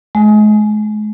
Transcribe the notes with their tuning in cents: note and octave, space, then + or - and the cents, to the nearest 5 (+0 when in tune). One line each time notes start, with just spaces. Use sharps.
G#3 +40